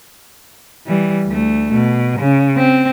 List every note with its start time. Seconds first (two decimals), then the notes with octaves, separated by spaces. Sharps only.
0.87 E3 G3
1.27 D2 A3
1.74 B2
2.20 C#3
2.57 C4